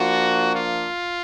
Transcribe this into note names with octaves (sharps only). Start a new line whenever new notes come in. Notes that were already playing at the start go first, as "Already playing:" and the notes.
Already playing: F3 A#3 D4 F4 F#4
F4